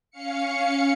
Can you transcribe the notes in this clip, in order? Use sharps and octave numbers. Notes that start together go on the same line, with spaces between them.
C#4 F5 C#7